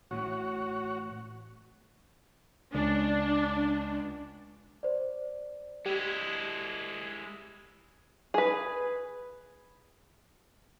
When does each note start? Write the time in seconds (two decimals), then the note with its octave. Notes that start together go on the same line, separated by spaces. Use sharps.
0.11 A1 A2 E3 F#4 C#5
2.74 C#2 D4
4.83 C5 D5
5.86 G#3 E4 G4
8.34 G#4 B4